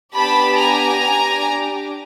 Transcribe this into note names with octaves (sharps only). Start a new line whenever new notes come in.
B3 D4 G4 A5 B5
G#5 A#5
D4 G4